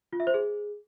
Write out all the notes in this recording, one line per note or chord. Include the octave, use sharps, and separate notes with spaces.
F4
E5
C5
G#4